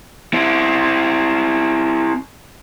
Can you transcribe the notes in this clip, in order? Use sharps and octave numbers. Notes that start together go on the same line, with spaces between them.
C4 E4